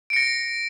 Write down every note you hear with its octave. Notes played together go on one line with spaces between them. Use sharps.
A#6 C#7 D7